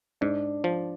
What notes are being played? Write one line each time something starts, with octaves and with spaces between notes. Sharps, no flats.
G#2 D4
F3